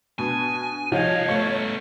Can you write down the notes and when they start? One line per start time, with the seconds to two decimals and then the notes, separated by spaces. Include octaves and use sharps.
0.19 B2 D4 G#5
0.92 C2 F3 C#5 D#5 F5
1.29 A3 B3 A4 C#6